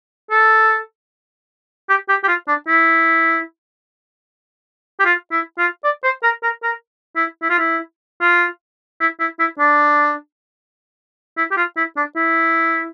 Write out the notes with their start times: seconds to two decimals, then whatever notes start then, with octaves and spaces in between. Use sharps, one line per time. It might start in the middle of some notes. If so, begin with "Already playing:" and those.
0.31 A4
1.89 G4
2.09 G4
2.23 G4
2.28 F4
2.48 D4
2.68 E4
5.00 G4
5.05 F4
5.31 E4
5.58 F4
5.84 D5
6.04 C5
6.23 A#4
6.43 A#4
6.63 A#4
7.16 E4
7.42 E4
7.50 F4
7.58 E4
8.21 F4
9.01 E4
9.20 E4
9.39 E4
9.59 D4
11.37 E4
11.51 G4
11.57 F4
11.77 E4
11.97 D4
12.16 E4